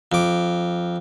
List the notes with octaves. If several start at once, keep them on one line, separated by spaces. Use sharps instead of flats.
F2 D6